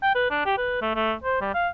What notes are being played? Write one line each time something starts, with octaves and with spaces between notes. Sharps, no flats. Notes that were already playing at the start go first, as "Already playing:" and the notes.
G5
B4
D4
G4
B4
A3
A3
C5
G3
F5